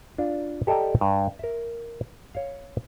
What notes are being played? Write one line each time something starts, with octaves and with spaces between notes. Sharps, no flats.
D4 F4
G4 A4 D5 D#5 G5 A#5
G2
A#4 E5
C#5 F5